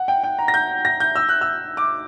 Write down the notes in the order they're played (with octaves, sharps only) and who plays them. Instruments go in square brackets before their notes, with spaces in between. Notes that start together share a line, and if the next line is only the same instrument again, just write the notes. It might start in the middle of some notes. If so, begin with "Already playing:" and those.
Already playing: [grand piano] F#5
G5
G5
A#5
A#6
G6
A#6
G6
E6
F#6
E6
D6